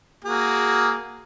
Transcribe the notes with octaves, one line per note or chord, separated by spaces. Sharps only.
A#3 F#4 G#4